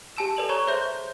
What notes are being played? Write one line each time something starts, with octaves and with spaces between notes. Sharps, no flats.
G4 G#5 A5 E6 E7
A4 B4 D5 F7 F#7
C#5 A#5 C#6 G#6 E7
G#4 C5 C#5 E5 C6 G6